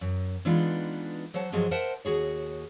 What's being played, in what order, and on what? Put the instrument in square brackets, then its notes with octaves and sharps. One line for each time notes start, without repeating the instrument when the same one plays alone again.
[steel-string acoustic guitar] F#2
E3 G#3 B3 D4 D#4 F4
F#3 C5 C#5 F#5 A5
G2 F3 F#3 G#4 C5 D#5
A#4 C5 E5 F#5 A5
D#2 F#4 G#4 C#5